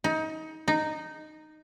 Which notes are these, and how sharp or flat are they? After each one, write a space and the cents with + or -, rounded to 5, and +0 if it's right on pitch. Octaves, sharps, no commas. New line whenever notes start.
D#4 +25
D#4 -10